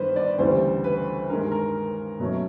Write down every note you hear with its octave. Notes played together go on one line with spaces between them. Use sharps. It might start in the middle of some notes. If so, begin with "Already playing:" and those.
Already playing: G2 D#3 G3 B3 B4 C5
D5
D2 C#3 E3 G3 C5
B4
G2 D#3 G#3 A#4
A#4
B2 F#3 A3 C#4